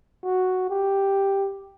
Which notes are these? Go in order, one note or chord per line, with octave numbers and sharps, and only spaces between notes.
F#4
G4